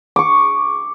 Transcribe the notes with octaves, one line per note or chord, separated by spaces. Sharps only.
C#6 D6